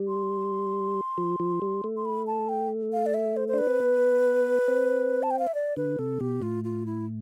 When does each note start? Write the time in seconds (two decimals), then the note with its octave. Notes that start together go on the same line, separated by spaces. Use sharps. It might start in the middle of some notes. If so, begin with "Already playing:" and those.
Already playing: G3
0.08 C6
1.18 F3
1.40 F3
1.62 G3
1.84 A3
1.97 C6
2.05 B5
2.27 A5
2.49 G5
2.93 F5
3.06 D5
3.14 E5
3.36 C5
3.48 C5
3.54 D4 B4
3.67 C4
3.80 B3
4.68 C4
5.23 A5
5.31 G5
5.39 F5
5.47 E5
5.54 D5
5.76 D3 B4
5.99 C3 A4
6.20 B2 G4
6.42 A2 F4
6.64 F4
6.86 E4